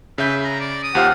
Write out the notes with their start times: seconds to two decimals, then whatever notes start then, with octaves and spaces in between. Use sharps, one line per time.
0.18 C#3 B4 E5 G6
0.44 A#5
0.60 D5
0.83 D#6
0.95 D#2 F4 G4 C5 F#5 F6